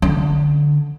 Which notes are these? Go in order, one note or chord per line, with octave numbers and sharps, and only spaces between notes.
D3